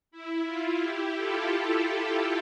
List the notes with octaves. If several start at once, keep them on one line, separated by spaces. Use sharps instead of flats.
E4
F4
E4 G4
F4 A4